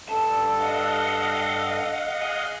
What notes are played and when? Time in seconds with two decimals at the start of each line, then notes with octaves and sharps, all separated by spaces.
0.09 G2 A4 A5
0.59 D#5 F5 F#5
2.22 G#4